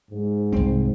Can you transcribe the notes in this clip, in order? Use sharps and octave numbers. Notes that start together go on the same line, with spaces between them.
G#2
C2 C4